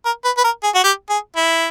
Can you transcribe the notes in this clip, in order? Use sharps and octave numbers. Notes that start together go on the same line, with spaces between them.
A#4
B4
B4
A#4
G#4
F#4
G4
G#4
E4